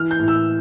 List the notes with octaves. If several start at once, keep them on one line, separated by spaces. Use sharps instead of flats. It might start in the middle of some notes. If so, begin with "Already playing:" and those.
Already playing: E3 F6
G6
A2
E6